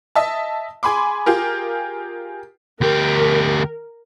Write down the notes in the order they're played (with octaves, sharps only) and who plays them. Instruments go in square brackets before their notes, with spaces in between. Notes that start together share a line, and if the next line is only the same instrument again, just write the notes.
[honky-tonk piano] D#5 E5 A5
G#4 G#5 B5 C6 D6
F4 G4 G#4 A#4
[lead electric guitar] D2 G4 [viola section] A#4